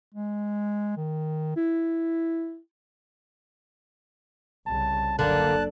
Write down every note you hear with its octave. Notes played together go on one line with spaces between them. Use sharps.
G#3
D#3
E4
C2 C#3 A5
F#1 D3 A#3 D4 A5 F#6